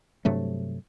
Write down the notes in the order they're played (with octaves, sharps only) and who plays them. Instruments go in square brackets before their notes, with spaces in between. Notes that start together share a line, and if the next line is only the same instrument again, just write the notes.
[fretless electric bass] G2 C3 F#3 A3